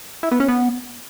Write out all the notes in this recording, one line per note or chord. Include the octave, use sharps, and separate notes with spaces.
E4
B3
C#4
B3